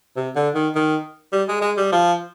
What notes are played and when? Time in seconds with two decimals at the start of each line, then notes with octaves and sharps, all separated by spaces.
0.16 C3
0.36 D3
0.55 D#3
0.75 D#3
1.33 G3
1.48 G#3
1.62 G#3
1.77 G3
1.92 F3